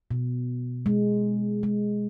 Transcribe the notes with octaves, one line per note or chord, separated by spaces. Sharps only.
B2
G#3
G#3